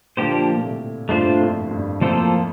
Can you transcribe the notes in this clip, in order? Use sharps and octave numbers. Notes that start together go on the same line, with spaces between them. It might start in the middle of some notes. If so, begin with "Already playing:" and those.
A#2 D3 F3 A#3 D4 G4 C5
A#2
A2 C3
G2 A#2 A3 D4 F4 C5
F2 A2
G2
F2 A2 F3 A#3 F4 A4 C5